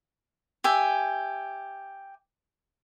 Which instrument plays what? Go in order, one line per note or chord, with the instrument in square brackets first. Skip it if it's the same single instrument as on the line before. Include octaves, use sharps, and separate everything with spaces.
[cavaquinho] G4 E5 G#5